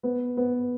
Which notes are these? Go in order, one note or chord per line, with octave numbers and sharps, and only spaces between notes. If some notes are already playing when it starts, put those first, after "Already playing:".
B3
B3